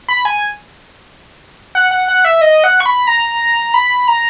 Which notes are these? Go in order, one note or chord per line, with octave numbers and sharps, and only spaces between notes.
B5
G#5
F#5
F#5
F#5
E5
D#5
F#5
C#6
B5
A#5
B5
A#5